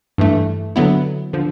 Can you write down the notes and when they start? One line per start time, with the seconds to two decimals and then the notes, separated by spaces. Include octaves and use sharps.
0.18 G2 E3 A3
0.76 D3 F#3 B3 E4
1.33 D3 F3